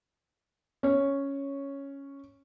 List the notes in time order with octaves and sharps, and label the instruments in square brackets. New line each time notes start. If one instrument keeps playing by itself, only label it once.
[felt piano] C#4 C#5